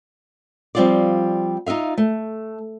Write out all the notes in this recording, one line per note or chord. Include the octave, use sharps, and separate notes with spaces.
F3 G3 C4 F4 C5 D5
D#4 F4 E5 F5
A3